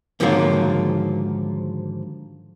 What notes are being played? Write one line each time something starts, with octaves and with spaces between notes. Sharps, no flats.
G#2 D3 D#3 F3 F#3 A#3